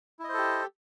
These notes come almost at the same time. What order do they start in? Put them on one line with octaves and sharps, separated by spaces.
E4 D#5 C5 A4 G4